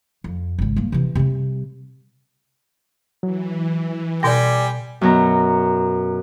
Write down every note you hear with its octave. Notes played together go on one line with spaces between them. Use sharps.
F2
G#1 C#3
G3 A#3
C3 E3
C3 G3
E3 F#3
B2 G3 G4 D5 G5 G#5 A#6
F#2 B2 A#5